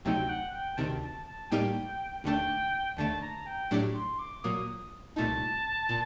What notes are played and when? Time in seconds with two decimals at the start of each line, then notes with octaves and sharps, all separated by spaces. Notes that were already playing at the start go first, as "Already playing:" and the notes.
0.05 D2 C3 F#3 A3 D#4 G5
0.29 F#5
0.53 G5
0.77 D2 C3 D#3 A5
1.02 A5
1.27 A5
1.51 A2 G3 A#3 D#4 G4 G5
2.24 D#2 D3 A3 D4 A4 G5
2.97 D#2 D3 A3 A5
3.21 A#5
3.46 G5
3.71 A2 F#3 A3 D4 G4
3.95 C6
4.19 D6
4.44 A#2 F#3 A#3 D#6
5.16 C2 A#2 A3 D#4 A5
5.89 A#2